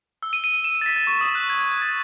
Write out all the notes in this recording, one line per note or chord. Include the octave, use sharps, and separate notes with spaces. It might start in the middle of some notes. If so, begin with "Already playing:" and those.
E6
D#7
D#7
D#7
E7
D#7
A6
B6
A6
C#6
D#6
F#6
G#6
G#6
G#6
A6